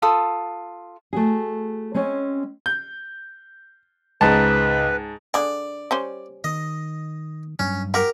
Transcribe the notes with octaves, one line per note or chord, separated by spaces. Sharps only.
F4 A4 D#6
A3 F#4 G#4
G#3 C4 C#4 C#5
G6
C#2 G#2 B4 A5
D3 G#4 D5
G3 C#4 C5
D#3 D#5
G2 F#3 C#4
F#4 G4 A#4